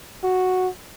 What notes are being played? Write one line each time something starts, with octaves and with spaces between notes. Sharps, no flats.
F#4